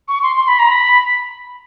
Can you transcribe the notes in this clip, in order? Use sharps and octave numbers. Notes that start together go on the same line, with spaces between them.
C#6
C6
C6
B5
A#5
B5